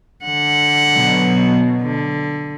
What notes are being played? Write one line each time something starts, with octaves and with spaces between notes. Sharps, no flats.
D3 F#5
B2 F#3
D3